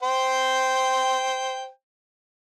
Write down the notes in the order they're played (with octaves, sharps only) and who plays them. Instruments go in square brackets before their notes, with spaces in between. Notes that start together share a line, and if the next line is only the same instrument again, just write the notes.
[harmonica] C5 G5